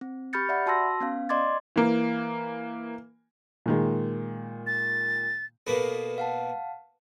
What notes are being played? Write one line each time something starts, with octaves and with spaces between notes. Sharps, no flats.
C4
G4 B5 F6 G6 A6 C#7
D5 E5 F#5 B5
F#4 A5 C6 E6 A#6
B3 C#4 F5
D5 D#5 C6 D6 G#6 A6
E3 A#3
A#2 D#3 G#3
A6
B2 A#3 B3 A4 B4
F5 F#5 A5